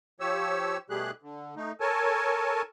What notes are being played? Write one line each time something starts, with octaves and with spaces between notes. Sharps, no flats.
F3 G4 C#5 E6
B2 G3 A3 G4 G#4 F#6
D3
A3 D#4
A4 A#4 C#5 G#5 A5